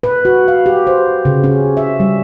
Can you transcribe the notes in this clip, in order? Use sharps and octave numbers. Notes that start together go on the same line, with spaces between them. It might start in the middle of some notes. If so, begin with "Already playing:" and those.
B4
F#4
F5
G4
C5
C#3
C#4
E5
G3